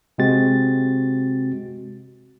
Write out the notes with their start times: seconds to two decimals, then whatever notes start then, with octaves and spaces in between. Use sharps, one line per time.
0.18 C3 G#3 C4 F#4 A6